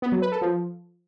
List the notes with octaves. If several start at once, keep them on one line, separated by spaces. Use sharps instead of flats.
B3
F#3
B4
A4
F3